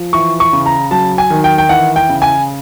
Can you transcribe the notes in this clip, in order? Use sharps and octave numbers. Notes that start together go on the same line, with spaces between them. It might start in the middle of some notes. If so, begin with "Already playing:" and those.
Already playing: F3
E3 C#6
C#6
C#3
A#5
F#3 A5
G#5
D#3
G5
G5
E3 F#5
G5
C#3
G#5